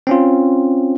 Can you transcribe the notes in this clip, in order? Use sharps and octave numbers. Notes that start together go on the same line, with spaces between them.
C4 C#4 F4